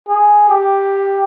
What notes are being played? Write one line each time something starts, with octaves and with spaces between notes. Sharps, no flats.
G#4
G4